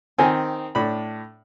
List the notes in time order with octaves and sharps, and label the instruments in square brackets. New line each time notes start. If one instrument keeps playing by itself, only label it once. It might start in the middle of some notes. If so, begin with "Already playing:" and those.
[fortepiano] D#3 C4 [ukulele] G#5
[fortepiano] A2 D4 B5